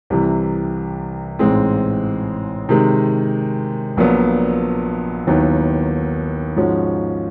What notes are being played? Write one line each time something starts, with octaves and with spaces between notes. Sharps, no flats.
C2 C3 E3
A1 G#2 E3 G#3 C4
C3 D#3 G#3
A#1 A#2 F#3 B3
D#2 D#3 F#3 B3 E4
G#2 F3 G#3 C#4 F#4